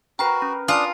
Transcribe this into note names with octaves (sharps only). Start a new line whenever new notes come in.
F#4 A#4 B4 G5 B5 C7
C#4
D4 F4 G#5 A5 D#6 F6